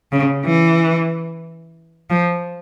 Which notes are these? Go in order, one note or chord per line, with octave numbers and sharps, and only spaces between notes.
C#3
E3
F3